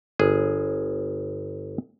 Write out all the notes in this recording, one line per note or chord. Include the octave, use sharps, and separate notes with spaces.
G1 G#4